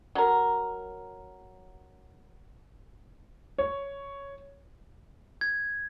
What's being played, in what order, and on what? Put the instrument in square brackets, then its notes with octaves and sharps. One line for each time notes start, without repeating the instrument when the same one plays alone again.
[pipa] F#3 A#4
[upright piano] C#5
[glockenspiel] G#6